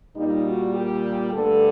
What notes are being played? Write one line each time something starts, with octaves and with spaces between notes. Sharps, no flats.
A#2 G3 A#3 D#4
F#4
G4
G2 D3 A3 A4